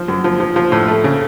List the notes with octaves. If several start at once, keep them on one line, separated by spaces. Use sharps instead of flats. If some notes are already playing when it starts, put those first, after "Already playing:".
Already playing: F3
F#2
F3
F3
F3
A2
A3
C#3